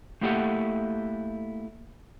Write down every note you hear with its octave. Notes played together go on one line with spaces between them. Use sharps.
A3 A#3 E4 G4 A4 F#5